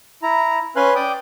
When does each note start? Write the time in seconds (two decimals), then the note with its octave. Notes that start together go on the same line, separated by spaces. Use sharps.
0.23 E4 A#5
0.76 C#4 B4 F5 G#5 C6 F#6
0.95 D5 G5 D6 D#6